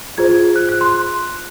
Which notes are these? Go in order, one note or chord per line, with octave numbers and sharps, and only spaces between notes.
F4 G#4 C5 G#6
F#6
F#6
C6